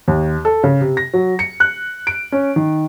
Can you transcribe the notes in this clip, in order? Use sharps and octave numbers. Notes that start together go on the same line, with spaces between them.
D#2
A4
C#3
C3
A#6
F#3
C#7
F#6
D7
C#4
D#3